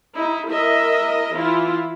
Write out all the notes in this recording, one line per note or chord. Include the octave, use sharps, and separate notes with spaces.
D#4 E4
E4 A#4 D#5 E5
E3 E4 F4